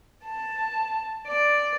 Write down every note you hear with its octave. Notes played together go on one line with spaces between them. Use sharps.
A5
D5